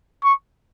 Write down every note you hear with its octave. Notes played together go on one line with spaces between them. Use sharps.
C#6